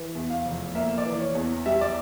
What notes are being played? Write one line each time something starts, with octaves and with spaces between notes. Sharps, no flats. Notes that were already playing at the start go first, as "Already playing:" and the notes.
Already playing: E3
E2
F5
F1
A#3 E5
D5
E3
C#5
E2
G3 E5
D5